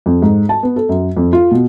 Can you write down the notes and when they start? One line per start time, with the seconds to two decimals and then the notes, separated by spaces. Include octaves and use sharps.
0.06 F2
0.22 G#2
0.49 A5
0.63 B3
0.76 A4
0.89 F#2
1.17 F2
1.33 F4
1.51 B2